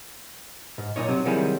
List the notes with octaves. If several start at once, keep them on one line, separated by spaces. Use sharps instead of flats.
G#2
B1 F2 A#2 D#4 C#5
C3 F#3
C3 D#3 F#3 G3 E4 G#4